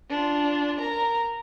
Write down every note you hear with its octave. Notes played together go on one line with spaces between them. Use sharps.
D4 F4
A#4 A#5